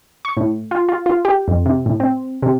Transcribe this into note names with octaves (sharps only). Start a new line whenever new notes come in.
C#6
A2
F4
F4
F4
G4
F2
C3
A2
C4
C3